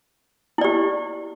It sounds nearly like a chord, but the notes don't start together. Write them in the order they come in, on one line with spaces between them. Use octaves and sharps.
E4 D5 G4